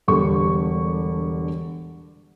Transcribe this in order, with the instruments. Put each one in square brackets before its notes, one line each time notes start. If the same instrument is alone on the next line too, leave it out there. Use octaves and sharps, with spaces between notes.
[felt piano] E1 D3 G3 C#6